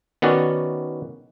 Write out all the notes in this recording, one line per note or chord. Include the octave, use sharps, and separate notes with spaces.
D#3 B3 C#4 F#4 D5